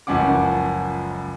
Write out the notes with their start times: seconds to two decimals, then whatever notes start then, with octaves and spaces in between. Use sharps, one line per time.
0.07 F#1 C#2 F3 C#4 F#5 D6